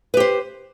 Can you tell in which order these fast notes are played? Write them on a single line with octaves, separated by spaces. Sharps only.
B4 G4 C5